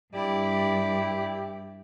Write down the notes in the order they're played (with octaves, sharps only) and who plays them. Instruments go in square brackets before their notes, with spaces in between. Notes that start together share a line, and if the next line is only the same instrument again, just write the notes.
[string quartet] G2 [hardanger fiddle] E4 D5 [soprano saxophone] G4